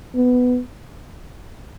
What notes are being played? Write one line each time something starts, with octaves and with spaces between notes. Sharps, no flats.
B3